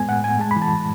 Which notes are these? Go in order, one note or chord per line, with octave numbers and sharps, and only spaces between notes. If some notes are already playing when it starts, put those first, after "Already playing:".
Already playing: G#3 B3 G#5
A2 F#5
A2 G#5
G#3 A5
B5
E3
A5